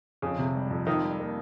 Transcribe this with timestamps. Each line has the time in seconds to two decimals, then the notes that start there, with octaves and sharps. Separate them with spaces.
0.22 F2 C#3
0.38 C3
0.55 G3
0.70 F2
0.86 D#3 F4
1.03 G3
1.19 A#3